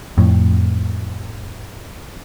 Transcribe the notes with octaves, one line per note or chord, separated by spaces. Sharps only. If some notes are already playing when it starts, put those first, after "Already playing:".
F2 A2